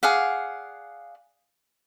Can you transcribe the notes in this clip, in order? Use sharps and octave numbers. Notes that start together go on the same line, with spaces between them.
G#4 D5 F5 F#5